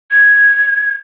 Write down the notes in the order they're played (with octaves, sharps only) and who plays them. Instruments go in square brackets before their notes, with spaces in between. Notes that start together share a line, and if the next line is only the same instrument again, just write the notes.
[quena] G#6